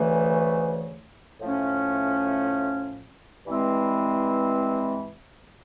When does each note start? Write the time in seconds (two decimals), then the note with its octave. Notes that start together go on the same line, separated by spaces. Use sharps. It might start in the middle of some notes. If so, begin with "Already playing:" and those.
Already playing: D2 C#3 E3 A3
1.41 A2 F3 A3 C#4
3.46 G2 E3 G#3 C4 E4